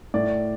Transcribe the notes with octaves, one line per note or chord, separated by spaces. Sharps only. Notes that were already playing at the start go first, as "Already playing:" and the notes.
A2 D5